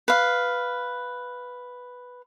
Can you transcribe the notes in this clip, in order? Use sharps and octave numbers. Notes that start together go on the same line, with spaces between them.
B4 F5